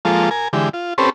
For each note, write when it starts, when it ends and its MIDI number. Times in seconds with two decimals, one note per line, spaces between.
0.05 0.29 53
0.05 0.29 56
0.05 0.29 58
0.05 0.29 65
0.05 0.29 69
0.31 0.48 70
0.31 0.48 80
0.53 0.69 50
0.53 0.69 52
0.53 0.69 56
0.53 0.69 67
0.73 0.94 65
0.98 1.10 60
0.98 1.10 61
0.98 1.10 67
0.98 1.10 69
0.98 1.10 71
0.98 1.10 72